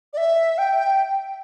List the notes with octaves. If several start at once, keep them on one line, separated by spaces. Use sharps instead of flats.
D5
E5
G5